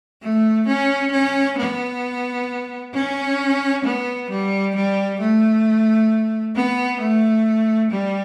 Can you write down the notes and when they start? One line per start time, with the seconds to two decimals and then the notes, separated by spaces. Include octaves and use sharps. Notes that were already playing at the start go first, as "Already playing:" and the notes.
0.21 A3
0.67 C#4
1.12 C#4
1.58 B3
2.94 C#4
3.84 B3
4.30 G3
4.75 G3
5.20 A3
6.55 B3
7.01 A3
7.91 G3